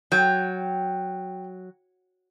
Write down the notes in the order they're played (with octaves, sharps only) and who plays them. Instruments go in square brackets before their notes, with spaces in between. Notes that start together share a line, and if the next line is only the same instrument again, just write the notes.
[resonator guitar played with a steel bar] F#3 [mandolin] G5